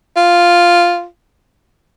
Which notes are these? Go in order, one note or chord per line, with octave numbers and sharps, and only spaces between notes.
F4